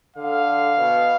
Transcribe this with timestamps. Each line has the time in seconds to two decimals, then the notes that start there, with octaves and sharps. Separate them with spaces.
0.16 D3 F5
0.78 B2